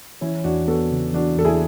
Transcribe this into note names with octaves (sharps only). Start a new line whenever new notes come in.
E3 C#4 E4
E2 D4 F#4
B3 F#4 A4
C#3
E3 D4 F#4
E2 A4
E4 G#4